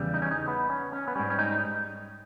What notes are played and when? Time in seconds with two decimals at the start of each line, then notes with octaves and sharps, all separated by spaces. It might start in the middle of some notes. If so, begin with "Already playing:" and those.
Already playing: E2 C#3 G3
0.14 D#4
0.22 C#4
0.31 D#4
0.48 B3
0.70 C#4
0.93 C#4
1.08 B3
1.15 G#2 G3 C#4
1.30 C#4
1.39 D#4